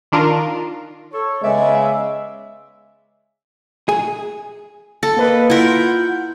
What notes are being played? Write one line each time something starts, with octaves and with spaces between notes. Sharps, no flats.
D#3 D4 F4 A#4
A4 C#5
C#3 G#3 B3 D5 E5
G#4
A4
A#3 B4 D#5
E4 F4 A#4 F#5 G6